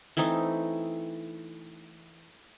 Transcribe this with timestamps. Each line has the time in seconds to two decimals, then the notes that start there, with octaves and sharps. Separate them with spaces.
0.17 E3 A3 C4 D#4